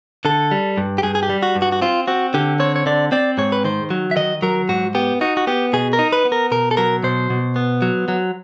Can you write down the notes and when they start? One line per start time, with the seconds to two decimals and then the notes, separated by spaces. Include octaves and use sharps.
0.25 D3 A4
0.51 G3
0.78 G2
0.98 G4
1.03 G2 G#4
1.15 G#4
1.23 G4
1.30 G3
1.43 F#4
1.56 G2
1.62 F#4
1.72 F#4
1.82 C4 F4
2.08 C4 F#4
2.34 D3 G4
2.60 C4 C#5
2.76 C#5
2.86 D3 D5
3.12 C4 D5
3.38 G#2 C#5
3.52 B4
3.64 D#3 C5
3.90 F#3
4.11 E5
4.16 D#3 D#5
4.42 F#3 A#4
4.69 G#2 F#4
4.95 B3 G4
5.21 D#4 F#4
5.37 F#4
5.47 B3 G4
5.73 B2 G#4
5.93 A#4
5.99 D#4
6.13 B4
6.25 B3
6.32 A#4
6.51 B2 A#4
6.71 A4
6.77 F#3 A#4
7.03 B2 C5
7.30 B2
7.56 B3
7.82 F#3
8.08 F#3